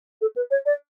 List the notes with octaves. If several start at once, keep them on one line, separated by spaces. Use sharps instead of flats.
A4
B4
C#5
D5